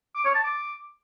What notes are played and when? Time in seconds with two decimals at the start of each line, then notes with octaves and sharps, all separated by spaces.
0.15 D6
0.25 C#5
0.35 A5
0.44 D6